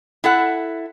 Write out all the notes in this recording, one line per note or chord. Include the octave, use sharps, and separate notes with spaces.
E4 A4 F#5